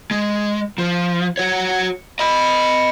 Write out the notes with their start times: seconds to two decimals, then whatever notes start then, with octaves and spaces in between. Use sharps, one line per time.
0.11 G#3
0.78 F3
1.37 F#4 C#5
2.19 D#5 B5